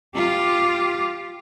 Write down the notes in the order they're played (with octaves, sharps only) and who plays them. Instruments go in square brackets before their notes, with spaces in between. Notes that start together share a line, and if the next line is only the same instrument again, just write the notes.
[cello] F4 G4